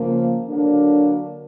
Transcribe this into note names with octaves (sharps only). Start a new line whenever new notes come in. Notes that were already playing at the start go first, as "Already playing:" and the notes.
Already playing: C#3 F3 A#3
D3 F#3 A#3 D4